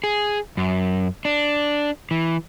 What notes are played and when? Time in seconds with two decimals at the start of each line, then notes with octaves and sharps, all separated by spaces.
0.04 G#4
0.57 F#2
1.25 D4
2.11 E3